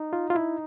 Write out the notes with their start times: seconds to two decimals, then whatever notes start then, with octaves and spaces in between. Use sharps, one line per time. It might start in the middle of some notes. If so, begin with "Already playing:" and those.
Already playing: D#4
0.13 F4
0.30 F4
0.35 E4